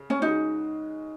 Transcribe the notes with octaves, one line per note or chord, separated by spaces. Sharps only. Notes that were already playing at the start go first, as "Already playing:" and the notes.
Already playing: C#3
C#4
C#3 G#3 D#4 F#4